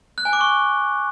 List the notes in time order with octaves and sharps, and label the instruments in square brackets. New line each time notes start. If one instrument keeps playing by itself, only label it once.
[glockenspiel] F#6
G#5
D6
C#6